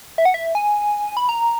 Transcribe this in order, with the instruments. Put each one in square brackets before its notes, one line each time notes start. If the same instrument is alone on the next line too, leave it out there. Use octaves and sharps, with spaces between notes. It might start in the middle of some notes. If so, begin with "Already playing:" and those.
[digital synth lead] E5
F#5
E5
G#5
B5
A#5